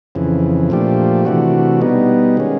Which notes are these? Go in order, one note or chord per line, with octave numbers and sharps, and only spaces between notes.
F2 C#3 E3
A#2 F3 A3 D4 G4
C3 E3 A3 D4 F#4
B2 G3 B3 D#4
D#3 G#3 C#4